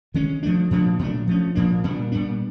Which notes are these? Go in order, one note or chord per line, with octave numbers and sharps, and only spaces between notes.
D#3 G#3 C#4
F3 A3 D4
A#2 F3 A3 D4
A#2 F#3 A3 D4
F3 A3 C#4
A#2 F3 A#3 D4
A#2 G3 B3 D4
A#2 G3 B3 D4